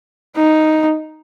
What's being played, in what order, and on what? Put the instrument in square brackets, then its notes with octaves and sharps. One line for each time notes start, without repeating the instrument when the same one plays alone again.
[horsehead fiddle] D#4